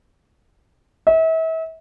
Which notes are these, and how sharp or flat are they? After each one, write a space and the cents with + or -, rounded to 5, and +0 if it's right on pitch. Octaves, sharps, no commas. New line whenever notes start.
E5 -35